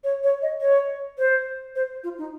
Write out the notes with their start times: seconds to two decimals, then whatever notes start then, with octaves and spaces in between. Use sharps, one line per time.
0.04 C#5
0.23 C#5
0.42 D#5
0.61 C#5
1.18 C5
1.76 C5
2.04 F4
2.18 D#4